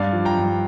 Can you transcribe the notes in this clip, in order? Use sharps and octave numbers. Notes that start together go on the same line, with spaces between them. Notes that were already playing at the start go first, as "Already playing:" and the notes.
Already playing: G2 D5 F5
F3
G5 A#5
G2